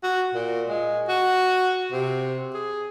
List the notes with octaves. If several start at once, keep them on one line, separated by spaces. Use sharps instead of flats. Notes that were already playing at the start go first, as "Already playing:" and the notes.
F#4
A#2
G#3
F#4
C3
G#4